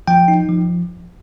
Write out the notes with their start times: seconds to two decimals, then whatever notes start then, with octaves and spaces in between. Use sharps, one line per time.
0.08 F3 G5
0.28 D#4
0.49 F3